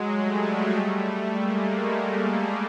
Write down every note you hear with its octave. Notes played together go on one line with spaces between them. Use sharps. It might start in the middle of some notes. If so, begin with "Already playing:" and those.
Already playing: F#3 G#3
G3 A3
G#3 A#3